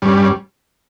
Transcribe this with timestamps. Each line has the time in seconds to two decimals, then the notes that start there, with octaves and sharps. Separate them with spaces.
0.02 G2 G3 C#4